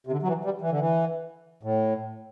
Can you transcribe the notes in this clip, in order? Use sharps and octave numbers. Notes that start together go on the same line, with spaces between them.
C3
D3
F#3
E3
G3
E3
D3
E3
A2